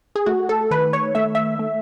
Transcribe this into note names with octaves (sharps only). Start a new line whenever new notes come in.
G#4
A3 F#4
A4
D#3 B4
C#5
A3 E5
E5
A3